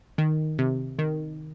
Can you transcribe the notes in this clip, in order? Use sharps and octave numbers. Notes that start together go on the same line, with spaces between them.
D#3
C3
D#3